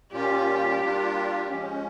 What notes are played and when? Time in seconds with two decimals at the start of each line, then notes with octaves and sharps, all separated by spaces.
0.12 A#2 G3 A#3 C#4 F4 G4
0.80 G3 A#3 D4 F4
1.48 F3 G#3 C#4